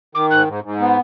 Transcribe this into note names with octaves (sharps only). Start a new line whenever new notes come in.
D#3 D6
G#2 F#6
G#2
G#2
B3